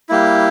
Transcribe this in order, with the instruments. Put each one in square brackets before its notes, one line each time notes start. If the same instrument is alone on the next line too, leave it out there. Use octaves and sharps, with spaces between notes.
[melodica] G3 A#3 E4